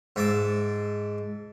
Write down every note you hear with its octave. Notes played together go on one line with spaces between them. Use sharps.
G#2 E5 A5 D6